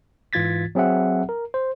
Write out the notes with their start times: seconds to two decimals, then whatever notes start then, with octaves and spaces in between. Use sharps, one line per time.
0.33 G#2 E3 F4 G#6 A6 B6
0.75 F#3 C4 G#4 E5 F#5
1.29 A#4
1.54 C5